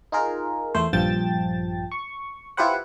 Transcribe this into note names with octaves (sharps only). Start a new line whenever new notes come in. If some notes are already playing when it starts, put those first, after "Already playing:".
D#4 F4 G#4 A#4
E2 A3 C5
A#1 G2 F3 G5 A5 A6
C#6
E4 F4 G4 B4 C5 F#5